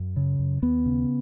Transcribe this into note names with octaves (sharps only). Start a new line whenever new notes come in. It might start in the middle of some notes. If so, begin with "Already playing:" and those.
Already playing: F#2
C#3
F#2
D#2 B3
C#3